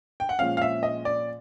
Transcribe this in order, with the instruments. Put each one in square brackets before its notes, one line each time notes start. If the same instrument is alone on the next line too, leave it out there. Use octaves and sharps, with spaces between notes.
[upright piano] G5
F#5
[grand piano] A#2 F3 G#3 C#4 [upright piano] F5
[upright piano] F5
E5
D#5
D5